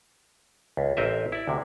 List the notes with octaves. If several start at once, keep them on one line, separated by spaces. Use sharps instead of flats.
C#2
A1 C4 A#4 D#5 E5
E4 D5
D2 C3